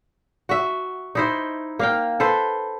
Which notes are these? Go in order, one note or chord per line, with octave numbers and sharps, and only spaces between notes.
F#4 E5
D#4 E4 C5
A#3 F5 G5
A4 B4 C5